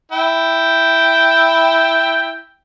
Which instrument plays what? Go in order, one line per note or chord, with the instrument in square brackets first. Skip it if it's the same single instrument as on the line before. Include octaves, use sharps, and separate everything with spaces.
[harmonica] E4 G5